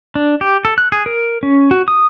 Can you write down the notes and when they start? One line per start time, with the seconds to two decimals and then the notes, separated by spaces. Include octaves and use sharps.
0.15 D4
0.41 G4
0.65 A4
0.78 F#6
0.92 G#4
1.06 A#4
1.43 C#4
1.71 F#4
1.88 D#6